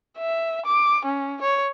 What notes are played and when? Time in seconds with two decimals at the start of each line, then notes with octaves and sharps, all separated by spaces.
0.18 E5
0.66 D6
1.05 C#4
1.42 C#5